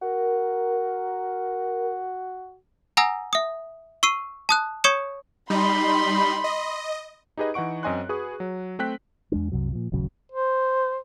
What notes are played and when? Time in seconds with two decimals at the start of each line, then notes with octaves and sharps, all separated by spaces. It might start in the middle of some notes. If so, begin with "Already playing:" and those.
0.02 F#4 A#4
2.97 F#5 G#5 A#5 D#6 E6 A#6
3.33 E5 D#6
4.03 C#6 E6 C7 D#7
4.49 A5 D#6 F#6
4.84 C#5 C#6 D#6 G#6 C#7 E7
5.50 G3 D#4 B5 C6
6.44 D#5
7.37 D#4 G4 G#4 B4 D#5
7.54 E3 D#4 F#5 C#6 D7
7.83 F#2 C4 D#5 G#5 C6 F#6
8.09 F#4 G#4 B4 C#6 D#6
8.40 F#3
8.79 A3 C4 G5 F#6 B6
9.32 E2 G#3 D4
9.52 C2 F#2 C3 F#3
9.72 A#2 F3
9.92 D#1 A1 C#3 F#3
10.32 C5